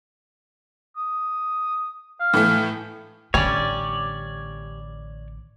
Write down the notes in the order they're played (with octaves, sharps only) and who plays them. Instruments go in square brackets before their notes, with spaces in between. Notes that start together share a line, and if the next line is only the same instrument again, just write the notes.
[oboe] D#6
F5
[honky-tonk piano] A2 E3 A3
[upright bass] A1 D3 [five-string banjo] G3 C#4 [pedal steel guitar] C#5 D5